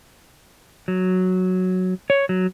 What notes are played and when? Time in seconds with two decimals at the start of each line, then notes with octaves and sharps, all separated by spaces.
0.88 F#3
2.10 C#5
2.29 F#3